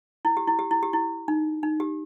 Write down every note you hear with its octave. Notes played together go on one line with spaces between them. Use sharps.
E4
G4
E4
G4
E4
G4
E4
D#4
D#4
G4